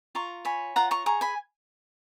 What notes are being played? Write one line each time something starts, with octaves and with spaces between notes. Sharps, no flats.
F4 A#5 C#6
C#5 G#5 B5
F4 F#5 A#5
A#5 C#6
G#4 A#5 C#6
G#5 B5